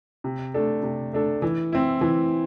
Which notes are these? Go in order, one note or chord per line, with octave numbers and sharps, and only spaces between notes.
C3
A3 D4 A4
C3
A3 D4 A4
E3
C4 E4
E3